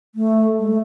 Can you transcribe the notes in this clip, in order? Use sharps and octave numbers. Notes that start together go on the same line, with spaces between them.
A3
G#3
A3